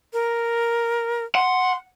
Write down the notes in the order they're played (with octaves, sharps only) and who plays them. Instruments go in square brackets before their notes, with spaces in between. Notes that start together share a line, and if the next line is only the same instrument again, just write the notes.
[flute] A#4
[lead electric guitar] F#5 [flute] C6